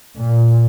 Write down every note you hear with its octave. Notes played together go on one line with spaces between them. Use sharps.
A#2